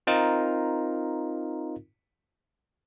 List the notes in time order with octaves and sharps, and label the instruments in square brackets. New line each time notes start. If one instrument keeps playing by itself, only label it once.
[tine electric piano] C4 D#4 F4 A#4